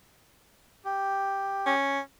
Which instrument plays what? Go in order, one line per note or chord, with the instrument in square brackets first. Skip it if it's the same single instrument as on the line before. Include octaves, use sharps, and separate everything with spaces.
[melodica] G4
[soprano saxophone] C#4